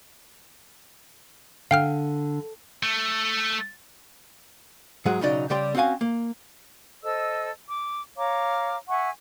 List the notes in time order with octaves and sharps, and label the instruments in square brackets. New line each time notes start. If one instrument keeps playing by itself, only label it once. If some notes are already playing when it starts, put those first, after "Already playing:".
[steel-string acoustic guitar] D3 [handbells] F5 G5 F6
[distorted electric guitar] A3
[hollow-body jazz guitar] G#2 F#3 G#3 G#4 F#5
B1 C#3 F#3 D#4 D5
C#3 G3 G4 D5 G5 C6
C4 C#4 F#4 F5 G#5
A#3
[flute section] A4 C5 D#5 E6
D6
C#5 F5 A#5 D6
E5 F#5 G#5 C#6